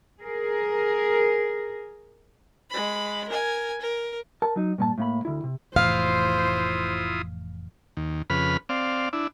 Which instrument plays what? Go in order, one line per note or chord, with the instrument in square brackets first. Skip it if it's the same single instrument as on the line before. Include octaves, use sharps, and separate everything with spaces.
[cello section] G#4 A#4
[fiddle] G#3 B5
A#4 G#5
A#4
[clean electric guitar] A#4 A5
F#3 D#4
G2 A#2 A5
A2 A#3 B5
D2 E4
C3
[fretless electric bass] F1 A2 E3 [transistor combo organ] E4 F4 D#6 [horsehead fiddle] C5 [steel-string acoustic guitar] F5
[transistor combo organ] D#2
F2 C#3 B4 B5 F6
C4 D5 F5
D4 E4